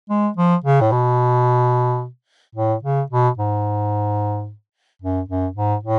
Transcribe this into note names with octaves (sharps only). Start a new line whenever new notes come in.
G#3
F3
C#3
A2
B2
A2
C#3
B2
G#2
F#2
F#2
G#2
A2